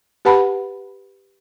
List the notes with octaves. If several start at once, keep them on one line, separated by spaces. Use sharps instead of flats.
G4 B4 F#5 A5 B5